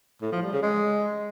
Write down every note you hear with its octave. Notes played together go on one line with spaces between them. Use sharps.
A2
F3
G3
C#3
G#3